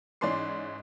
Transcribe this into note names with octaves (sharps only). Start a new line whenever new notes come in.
G#2 E3 C#4 D5 C6 C7